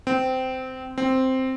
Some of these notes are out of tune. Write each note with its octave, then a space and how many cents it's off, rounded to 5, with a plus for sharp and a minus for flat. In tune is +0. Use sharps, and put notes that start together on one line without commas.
C4 -15
C4 +0